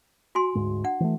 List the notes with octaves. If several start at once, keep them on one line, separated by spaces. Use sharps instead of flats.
F#4 G#5 C6
D2 G#2 G#3
D4 F#5
E3 G3 A3